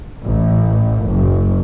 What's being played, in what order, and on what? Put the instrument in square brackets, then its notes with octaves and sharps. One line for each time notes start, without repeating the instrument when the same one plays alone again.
[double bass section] A1
F#1